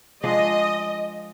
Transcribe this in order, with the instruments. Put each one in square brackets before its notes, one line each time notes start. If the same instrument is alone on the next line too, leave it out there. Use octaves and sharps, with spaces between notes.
[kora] F3 G#3 D4 [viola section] D#5